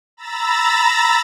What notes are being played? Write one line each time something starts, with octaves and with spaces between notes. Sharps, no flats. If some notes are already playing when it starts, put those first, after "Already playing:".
A#5 B5 E6 A6 A#6